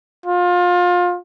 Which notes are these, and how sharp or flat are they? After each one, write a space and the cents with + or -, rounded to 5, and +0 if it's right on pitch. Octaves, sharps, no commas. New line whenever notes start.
F4 +25